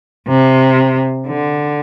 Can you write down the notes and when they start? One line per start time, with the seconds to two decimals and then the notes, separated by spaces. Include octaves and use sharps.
0.28 C3
1.27 D3